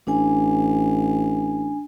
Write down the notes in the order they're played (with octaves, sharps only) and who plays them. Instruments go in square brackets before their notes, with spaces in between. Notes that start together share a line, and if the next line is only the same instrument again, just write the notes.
[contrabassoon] A1 [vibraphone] D4 G#5